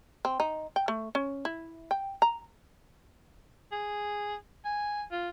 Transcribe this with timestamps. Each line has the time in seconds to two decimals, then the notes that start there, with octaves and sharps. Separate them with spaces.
0.25 C4
0.40 D#4
0.76 G5
0.88 A3
1.15 C#4
1.45 E4
1.91 G5
2.22 A#5
3.71 G#4
4.65 G#5
5.12 F4